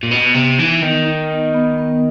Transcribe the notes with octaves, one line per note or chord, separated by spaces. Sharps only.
A#2
B2 B3
C3 B3
E3 D#4
D#3 B3
D#4
B3
B3
B3